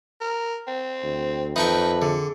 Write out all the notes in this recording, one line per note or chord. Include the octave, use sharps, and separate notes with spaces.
A#4
C4
D2
F2 D#4 B4 E5 G5 A5 C#6
D3 G#4